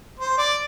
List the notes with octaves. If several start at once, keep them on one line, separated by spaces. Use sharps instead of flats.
C5
D5